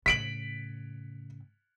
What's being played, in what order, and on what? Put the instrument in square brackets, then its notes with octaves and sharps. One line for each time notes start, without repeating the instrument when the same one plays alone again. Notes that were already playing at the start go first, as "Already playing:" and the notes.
[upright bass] A2 C#3 [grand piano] B6 D7 F#7